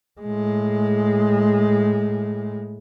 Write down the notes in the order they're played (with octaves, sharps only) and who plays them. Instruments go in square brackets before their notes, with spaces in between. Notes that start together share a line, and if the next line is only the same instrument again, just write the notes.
[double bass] A2 G#3